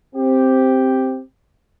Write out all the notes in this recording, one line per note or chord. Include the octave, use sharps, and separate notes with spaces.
C4 G4